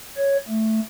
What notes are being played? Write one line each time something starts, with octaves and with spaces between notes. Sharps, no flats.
C#5
A3